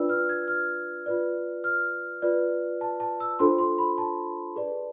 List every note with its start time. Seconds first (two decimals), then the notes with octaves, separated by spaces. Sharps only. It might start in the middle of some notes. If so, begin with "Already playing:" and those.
Already playing: D4 F4 B4 D5 E6
0.09 F6
0.29 G#6
0.48 F6
1.06 F4 B4 D5
1.64 F6
2.22 F4 B4 D5
2.81 A5
3.00 A5
3.20 E6
3.39 D4 F4 A4 C5 C6
3.58 C6
3.78 B5
3.98 A5
4.56 G#4 B4 D5